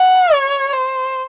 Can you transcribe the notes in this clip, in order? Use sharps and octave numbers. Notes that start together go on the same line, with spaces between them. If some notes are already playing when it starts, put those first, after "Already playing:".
Already playing: F#5
C#5
C5